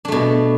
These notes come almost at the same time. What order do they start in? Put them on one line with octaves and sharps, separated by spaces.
D4 A3 B2